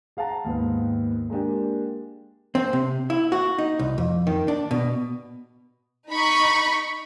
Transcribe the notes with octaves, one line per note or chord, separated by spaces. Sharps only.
G#4 F5 F#5 A5 A#5
D#2 G#2 B3
G#3 A#3 D4 G4
C4
C3
E4
F#4
D#4
C2
F2
D#3
D4
B2
D#4 B5 C#6